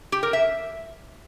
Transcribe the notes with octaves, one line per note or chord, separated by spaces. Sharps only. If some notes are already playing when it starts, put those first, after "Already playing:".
G4
A#4
E5